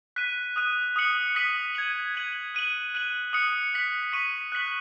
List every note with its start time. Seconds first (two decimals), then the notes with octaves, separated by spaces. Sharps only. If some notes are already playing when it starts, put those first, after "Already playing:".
0.16 F#6 B6 D#7
0.56 D#6 F#6 D#7
0.96 D#6 F#6 C#7 F#7
1.35 D#6 B6 D#7 F#7
1.75 G#6 D#7 F#7
2.15 G#6 D#7 F#7
2.55 F#6 D#7 F#7
2.94 F#6 D#7 F#7
3.33 D#6 F#6 C#7 F#7
3.74 F#6 B6 F#7
4.13 C#6 B6 D#7 F#7
4.52 F#6 B6 F#7